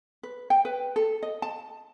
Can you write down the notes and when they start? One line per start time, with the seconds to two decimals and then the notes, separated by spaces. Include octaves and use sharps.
0.23 B4
0.50 G5
0.65 B4
0.96 A4
1.23 D#5
1.42 A5